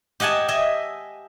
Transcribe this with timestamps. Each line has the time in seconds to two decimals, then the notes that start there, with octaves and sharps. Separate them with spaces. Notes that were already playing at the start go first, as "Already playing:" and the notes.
0.20 G4 D#5 F#5 G#5 A5
0.48 D#5 E5 G#5